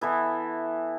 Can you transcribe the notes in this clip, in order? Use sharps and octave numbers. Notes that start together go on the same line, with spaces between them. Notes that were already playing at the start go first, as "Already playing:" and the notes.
E3 B3 E4 A4